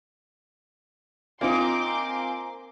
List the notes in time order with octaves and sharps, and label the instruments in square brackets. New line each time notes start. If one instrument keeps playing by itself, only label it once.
[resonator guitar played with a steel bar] A#3 D#4 [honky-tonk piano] C4 F4 [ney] G#5 [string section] C6 D6